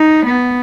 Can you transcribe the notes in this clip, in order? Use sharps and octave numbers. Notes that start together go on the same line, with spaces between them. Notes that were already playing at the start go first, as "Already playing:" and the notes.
Already playing: D#4
B3